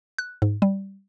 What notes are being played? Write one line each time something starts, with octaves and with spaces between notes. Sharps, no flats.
F#6
G#2
G3